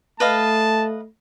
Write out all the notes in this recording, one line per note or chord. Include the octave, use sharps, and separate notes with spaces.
A3 B4 D#5 F5 A5